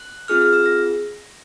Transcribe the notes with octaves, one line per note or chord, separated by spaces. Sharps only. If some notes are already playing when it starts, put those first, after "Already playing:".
Already playing: F#6
C4 F4 G#4 F6
F6
E6
A#6